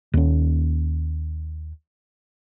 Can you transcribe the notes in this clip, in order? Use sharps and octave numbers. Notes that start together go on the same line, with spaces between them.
D#2 C#4